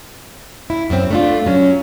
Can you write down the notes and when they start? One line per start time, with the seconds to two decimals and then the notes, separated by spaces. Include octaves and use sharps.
0.70 E4
0.90 F#2 C4
1.11 A3 D4 F4
1.46 F#3 C#4